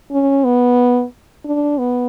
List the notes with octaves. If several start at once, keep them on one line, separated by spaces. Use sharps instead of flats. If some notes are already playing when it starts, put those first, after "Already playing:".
C#4
B3
D4
B3